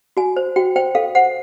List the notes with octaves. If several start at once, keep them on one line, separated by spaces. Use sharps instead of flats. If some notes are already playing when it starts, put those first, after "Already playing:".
F#4 G#5
C5
F#4 G5
C5 G5
A4 F5
C5 F#5